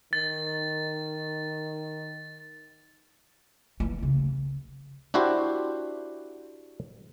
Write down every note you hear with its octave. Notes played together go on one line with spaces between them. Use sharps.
D#3 A6
E3 A#3
D2 C#3
D4 E4 F#4 G4 C5